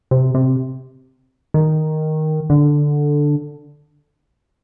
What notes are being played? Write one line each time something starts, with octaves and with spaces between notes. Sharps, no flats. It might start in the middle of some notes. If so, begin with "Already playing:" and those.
C3
C3
D#3
D3